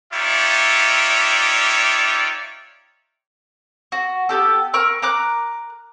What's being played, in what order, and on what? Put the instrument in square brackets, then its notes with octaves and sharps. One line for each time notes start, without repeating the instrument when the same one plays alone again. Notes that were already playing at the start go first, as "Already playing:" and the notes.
[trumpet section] D#4 F4 G4 C#5 D5 E5
[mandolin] F#4
B3 F#4 G4 A4
A#4 C#6 E6
A#4 A#5 D6 F#6